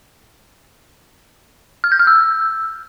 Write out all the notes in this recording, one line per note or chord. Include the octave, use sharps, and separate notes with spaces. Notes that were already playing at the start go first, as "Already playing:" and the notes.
F6
G6
F6
E6